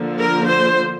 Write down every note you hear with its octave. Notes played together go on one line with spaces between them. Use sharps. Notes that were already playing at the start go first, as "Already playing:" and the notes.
Already playing: D3 F3 A#3
A#4
C5